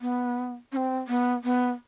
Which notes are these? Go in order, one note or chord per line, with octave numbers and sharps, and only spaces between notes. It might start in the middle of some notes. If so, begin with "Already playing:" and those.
B3
C#4
C4
B3
B3